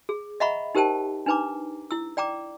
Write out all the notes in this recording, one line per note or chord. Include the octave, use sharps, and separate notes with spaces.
G#4
D#5 E5 F#5 A#5 B5 C#6
D#4 G4 A#4 C5 G5 A5
D4 D#4 B4 A#5 D6
E4 E6
D5 G5 A#5 D6